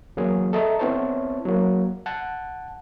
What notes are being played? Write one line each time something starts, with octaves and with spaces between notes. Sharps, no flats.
E2 F#3 A#3 G#4
A4 D#5 E5 A#5
B3 C4 E4 C5 C#5 A5
F#3 A#3
F#5 A5